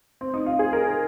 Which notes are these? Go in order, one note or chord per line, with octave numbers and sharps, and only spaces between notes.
C4
D#4
F4
G#4
A#4